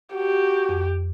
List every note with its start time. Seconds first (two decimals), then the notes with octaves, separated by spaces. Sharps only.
0.15 F#4 G4
0.69 F2